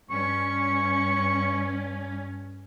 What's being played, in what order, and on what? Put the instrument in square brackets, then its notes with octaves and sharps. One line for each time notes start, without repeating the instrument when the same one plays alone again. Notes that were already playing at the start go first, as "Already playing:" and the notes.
[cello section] G2 C#4 [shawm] C#6